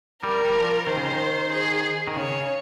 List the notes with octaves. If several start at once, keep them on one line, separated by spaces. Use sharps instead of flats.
G3 A#4
G3
F3
D#3 C5
C#3
D#3
G#4
D#3
C#3 C#5